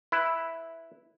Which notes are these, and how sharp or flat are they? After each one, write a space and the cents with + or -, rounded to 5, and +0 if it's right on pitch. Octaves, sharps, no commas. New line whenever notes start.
E4 +0 B4 +0